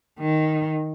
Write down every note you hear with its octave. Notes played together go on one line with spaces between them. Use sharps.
D#3